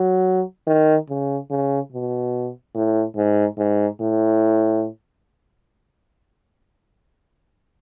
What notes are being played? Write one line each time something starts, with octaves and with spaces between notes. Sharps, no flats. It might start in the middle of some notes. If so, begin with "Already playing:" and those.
Already playing: F#3
D#3
C#3
C#3
B2
A2
G#2
G#2
A2